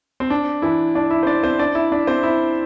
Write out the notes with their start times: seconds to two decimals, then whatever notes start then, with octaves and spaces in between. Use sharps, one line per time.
0.20 C4
0.30 D4
0.62 E3 E4
0.95 D4 D5
1.10 E4 E5
1.23 C5
1.26 D4 D5
1.43 C4 C5
1.59 D4 D5
1.75 E4 E5
1.92 D4 D5
2.07 C4 C5
2.23 E4 E5